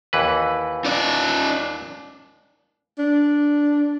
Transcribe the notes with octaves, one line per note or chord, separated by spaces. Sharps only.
D#2 E3 B4
D#4 D5
D4